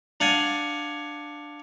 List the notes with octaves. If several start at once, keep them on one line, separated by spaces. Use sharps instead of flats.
D4 F5 F#5 G#5